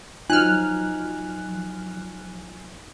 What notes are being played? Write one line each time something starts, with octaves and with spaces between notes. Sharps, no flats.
F3 F#3 D#4 G#5 F6 F#6